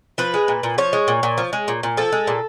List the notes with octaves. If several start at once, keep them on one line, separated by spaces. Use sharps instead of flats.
F3 B4
G#3
A#2
A#2
F3 C#5
G#3
A#2
A#2
F3
G#3
A#2
A#2
F3 A4
G#3
A#2